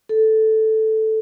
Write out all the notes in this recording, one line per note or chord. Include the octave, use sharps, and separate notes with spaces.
A4